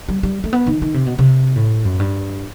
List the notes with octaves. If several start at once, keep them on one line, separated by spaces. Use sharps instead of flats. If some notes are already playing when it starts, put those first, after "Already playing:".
G3
G3
A3
B3
D#3
D#3
C3
B2
C3
A2
F#2
G2